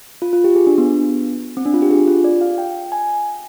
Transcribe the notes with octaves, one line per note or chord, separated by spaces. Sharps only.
F4
F4
G4
G#4
D4
B3
C4
D4
F4
G4
G#4
F4
D5
F5
G5
G#5